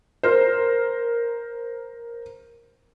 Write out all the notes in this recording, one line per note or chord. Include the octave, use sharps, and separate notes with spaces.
A#4 C5